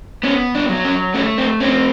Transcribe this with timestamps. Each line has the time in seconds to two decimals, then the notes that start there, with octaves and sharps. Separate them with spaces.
0.23 B3 C#4
0.55 D4
0.69 F#3
0.85 C#4
1.14 A3 C#4
1.38 C4
1.60 C4 C#4